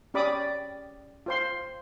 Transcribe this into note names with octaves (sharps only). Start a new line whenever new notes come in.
C#4 G4 D5 B5 D6 D#6
F4 C5 C6